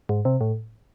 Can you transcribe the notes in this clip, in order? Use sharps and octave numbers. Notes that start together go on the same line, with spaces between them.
G#2
C3
A2